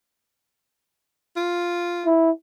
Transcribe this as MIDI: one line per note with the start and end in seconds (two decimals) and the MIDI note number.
1.36 2.09 65
2.06 2.31 64